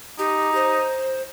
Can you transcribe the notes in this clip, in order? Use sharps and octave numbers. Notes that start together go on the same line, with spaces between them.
D#4 G4
C5